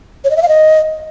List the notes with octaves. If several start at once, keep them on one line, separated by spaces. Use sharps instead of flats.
C#5
D#5
E5
F5
D#5